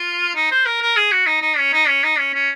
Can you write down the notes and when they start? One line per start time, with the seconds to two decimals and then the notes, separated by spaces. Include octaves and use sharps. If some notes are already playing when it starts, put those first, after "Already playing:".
Already playing: F4
0.35 D#4
0.51 C5
0.66 A#4
0.82 A#4
0.97 G#4
1.12 F#4
1.27 D#4
1.42 D#4
1.58 C#4
1.73 D#4
1.88 C#4
2.04 D#4
2.19 C#4
2.34 C#4